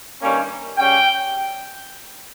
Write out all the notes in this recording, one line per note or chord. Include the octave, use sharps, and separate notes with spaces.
G2 D#3 G3 A#3 C#4
C#3 G3 C#4 G5